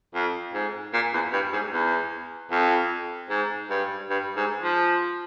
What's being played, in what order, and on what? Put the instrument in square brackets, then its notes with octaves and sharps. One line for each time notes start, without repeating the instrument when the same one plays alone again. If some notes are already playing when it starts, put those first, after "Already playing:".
[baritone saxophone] F2
G#2
A#2
E2
G2
G#2
E2
F2
G#2
G2
G2
G#2
F3